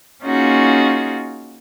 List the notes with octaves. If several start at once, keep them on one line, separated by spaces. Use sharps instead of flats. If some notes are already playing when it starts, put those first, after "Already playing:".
A#3 C#4 D#4 F4 F#4 G#4